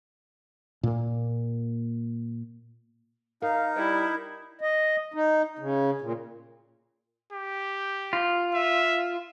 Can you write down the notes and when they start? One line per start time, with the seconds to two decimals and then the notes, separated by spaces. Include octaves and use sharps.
0.83 A#2 A#3
3.42 D#4 A#4 F5
3.77 G3 E4
4.61 D#5
5.14 D#4
5.59 C#3
6.01 A#2
7.32 G4
8.13 F4
8.54 E5